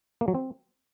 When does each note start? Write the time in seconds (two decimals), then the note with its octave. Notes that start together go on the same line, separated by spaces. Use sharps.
0.21 A#3
0.28 F#3
0.35 C4